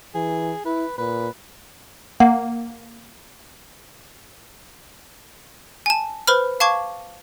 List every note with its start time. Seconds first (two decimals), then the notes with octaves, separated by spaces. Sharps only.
0.15 E3 G#4
0.65 E4 B4
0.98 A#2 B4
2.20 A#3 F#5
5.86 G#5 A5
6.27 B4 C5 B5 F6
6.60 F5 A5 C#6 D6 G#6